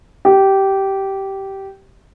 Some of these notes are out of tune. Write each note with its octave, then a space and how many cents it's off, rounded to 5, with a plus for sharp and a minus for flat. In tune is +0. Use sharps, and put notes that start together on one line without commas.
G4 -15